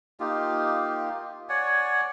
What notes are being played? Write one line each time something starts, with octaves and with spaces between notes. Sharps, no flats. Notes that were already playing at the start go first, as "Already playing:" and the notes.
A#3 D#4 F4 G4
C#5 D5 F#5 G#5